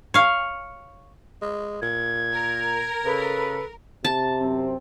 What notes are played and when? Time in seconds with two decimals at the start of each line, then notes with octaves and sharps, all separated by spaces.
0.14 C#5 F5
1.42 G#3
1.82 A#2 G#6
2.32 A#4
3.05 C#3 A4 B4
4.04 C3 A5
4.41 F#2 C4